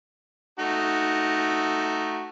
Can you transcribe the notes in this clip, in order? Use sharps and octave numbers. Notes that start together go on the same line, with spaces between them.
A3 D#4 F#4